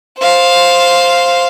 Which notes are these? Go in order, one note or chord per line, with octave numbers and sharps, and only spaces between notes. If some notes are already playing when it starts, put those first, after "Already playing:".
C5 F5